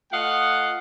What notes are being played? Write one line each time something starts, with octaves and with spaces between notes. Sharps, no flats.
A3 F4 D#5 F5 F#5